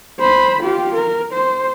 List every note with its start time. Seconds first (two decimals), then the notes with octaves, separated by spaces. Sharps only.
0.19 C5 B5
0.62 F4 G4
0.94 A#4
1.33 C5